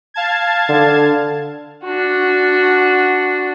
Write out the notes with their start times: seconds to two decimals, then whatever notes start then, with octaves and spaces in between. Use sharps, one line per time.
0.14 F5 A5 G#6
0.69 D3
1.85 D4 F#4